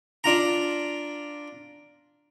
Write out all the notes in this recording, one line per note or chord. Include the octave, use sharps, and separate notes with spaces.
D4 F4 A#5